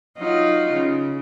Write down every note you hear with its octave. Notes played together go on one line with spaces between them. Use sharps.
F#3 D#4 F4
C#3